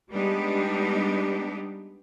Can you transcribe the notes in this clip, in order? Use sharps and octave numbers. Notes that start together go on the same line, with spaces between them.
G3 G#3 B3 D4 D#4 G4